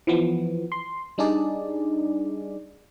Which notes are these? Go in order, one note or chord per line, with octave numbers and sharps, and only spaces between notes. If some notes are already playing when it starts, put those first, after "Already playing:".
E3 F3 B3
C6
G3 D4 D#4 G#4 D5